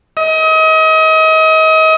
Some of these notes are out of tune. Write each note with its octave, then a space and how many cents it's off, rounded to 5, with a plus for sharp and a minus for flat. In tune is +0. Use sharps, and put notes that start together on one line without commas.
D#5 +35